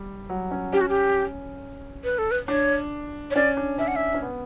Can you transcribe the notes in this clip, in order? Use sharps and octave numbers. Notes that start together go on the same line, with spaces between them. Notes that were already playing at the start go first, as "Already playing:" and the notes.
Already playing: G3
F#3
C#4
C#4 G4
F#4
G4
B4
A4
B4
D4 C#5
C#5
C#4 D5
D4
C#4 E5
F#5
E5
C#4
B3